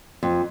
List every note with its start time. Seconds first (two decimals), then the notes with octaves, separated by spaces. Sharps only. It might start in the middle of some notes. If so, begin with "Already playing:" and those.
0.23 F2